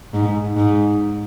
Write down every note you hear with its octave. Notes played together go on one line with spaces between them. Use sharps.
G#2
G#2